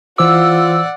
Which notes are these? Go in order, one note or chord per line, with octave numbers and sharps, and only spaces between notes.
E3 F4 C5 D5 F#5 D6 E6